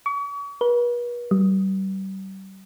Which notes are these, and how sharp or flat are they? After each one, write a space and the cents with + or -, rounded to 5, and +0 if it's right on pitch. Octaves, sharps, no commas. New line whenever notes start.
C#6 +40
B4 -40
G3 -35